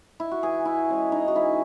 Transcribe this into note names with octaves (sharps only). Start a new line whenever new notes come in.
E4
F#4
E3 G#4
E4
G#3 C#4
D#4
F#4
E3 E4